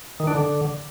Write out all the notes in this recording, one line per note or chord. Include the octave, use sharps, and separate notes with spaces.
D#3
D4
D3